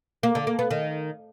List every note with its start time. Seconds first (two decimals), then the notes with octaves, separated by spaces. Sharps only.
0.23 A#3
0.35 D3
0.47 A#3
0.59 B3
0.71 D#3